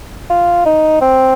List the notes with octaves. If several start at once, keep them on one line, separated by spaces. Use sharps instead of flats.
F4
D#4
C4